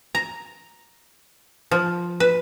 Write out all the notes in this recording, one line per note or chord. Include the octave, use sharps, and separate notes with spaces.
A#5
F3
B4